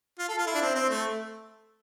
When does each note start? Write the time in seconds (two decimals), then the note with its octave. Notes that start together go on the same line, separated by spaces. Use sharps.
0.19 F4
0.29 A4
0.38 F4
0.47 E4
0.55 D4
0.62 C4
0.75 C4
0.90 A3